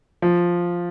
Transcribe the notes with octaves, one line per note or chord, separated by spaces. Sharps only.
F3